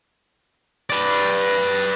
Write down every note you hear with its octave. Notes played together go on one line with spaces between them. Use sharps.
B4 D5